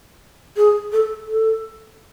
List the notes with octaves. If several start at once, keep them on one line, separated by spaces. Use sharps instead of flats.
G#4
A4
A4